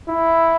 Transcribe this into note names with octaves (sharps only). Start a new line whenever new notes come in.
E4